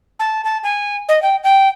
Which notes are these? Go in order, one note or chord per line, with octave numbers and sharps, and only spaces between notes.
A5
A5
G#5
D#5
G5
G5